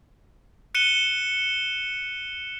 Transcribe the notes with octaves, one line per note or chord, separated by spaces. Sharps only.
F#6 C#7 D#7 E7 G7